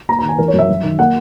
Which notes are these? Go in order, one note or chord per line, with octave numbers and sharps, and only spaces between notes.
A#3 A#5
A#5
D#3
G#5
E3 A#4
C#5
F#2
E5
F#3
D#3
A#3 F#5